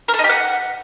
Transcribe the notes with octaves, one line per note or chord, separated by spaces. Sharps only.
A#4
A4
D#4
G4
F#5